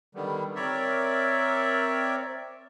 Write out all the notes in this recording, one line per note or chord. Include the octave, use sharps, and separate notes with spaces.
D3 D#3 G3 B3
C4 A#4 C#5 D5 E5